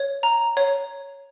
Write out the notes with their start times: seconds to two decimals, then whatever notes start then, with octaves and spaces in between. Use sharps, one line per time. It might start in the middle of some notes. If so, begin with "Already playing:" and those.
Already playing: C#5
0.23 A#5
0.57 C#5